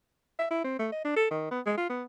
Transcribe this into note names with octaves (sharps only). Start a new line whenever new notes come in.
E5
E4
C4
A3
D#5
D4
A4
D#3
B3
G#3
F4
B3